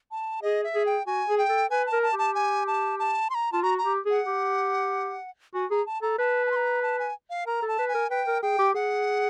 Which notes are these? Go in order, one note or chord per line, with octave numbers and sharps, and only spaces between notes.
A5
G#4 D#5
E5
G#4
G5
F#4 G#5
G#4
G5
A4
B4 G#5
A5
A#4
A5
G4
A5
G#5
A5
A5
C6
A#5
F4 A5
F#4 A#5
A#5
G4
G#4 F#5
G4
F#4 G#5
G#4 A#5
A5
A4 A#5
B4 A5
A5
C6
A#5
A5
G#5
F5
A#4 A#5
A4
A5
B4
G#5
A#4
B4 G5
A#4
G#4 G5
G4
G#4 F#5